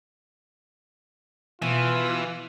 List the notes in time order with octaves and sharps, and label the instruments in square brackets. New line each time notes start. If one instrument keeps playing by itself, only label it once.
[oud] B2 [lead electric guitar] E3 [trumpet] F4